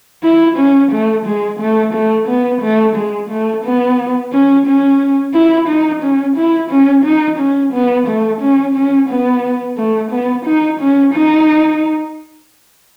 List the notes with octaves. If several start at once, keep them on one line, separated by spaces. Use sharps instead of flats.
E4
C#4
A3
G#3
A3
A3
B3
A3
G#3
A3
B3
C#4
C#4
E4
D#4
C#4
E4
C#4
D#4
C#4
B3
A3
C#4
C#4
B3
A3
B3
D#4
C#4
D#4